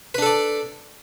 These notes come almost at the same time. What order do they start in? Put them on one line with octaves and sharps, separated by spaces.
B4 D4 A4 D5